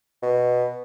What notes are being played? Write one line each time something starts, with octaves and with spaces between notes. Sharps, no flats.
B2